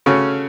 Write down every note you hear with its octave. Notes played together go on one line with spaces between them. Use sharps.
C#3 A3 C#4 F#4